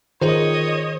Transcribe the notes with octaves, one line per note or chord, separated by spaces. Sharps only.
D#3 F4 G#4 A#4 C5 C#5 D#5